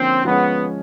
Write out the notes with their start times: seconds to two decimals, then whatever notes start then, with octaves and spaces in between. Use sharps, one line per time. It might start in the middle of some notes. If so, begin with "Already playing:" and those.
Already playing: D3 F3 A#3 C4 C#4
0.24 F3 G#3 B3 C#4